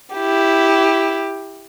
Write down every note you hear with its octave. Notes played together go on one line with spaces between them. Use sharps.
E4 G4